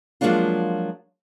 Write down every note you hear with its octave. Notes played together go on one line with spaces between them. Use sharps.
F3 F#3 G#3 A#3 D4 F4